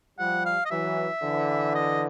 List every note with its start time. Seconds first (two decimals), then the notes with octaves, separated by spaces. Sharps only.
0.19 F3 G3 F#5
0.46 F5
0.65 D#5
0.71 E3 F#3 E5
1.23 D3 E3
1.75 D#5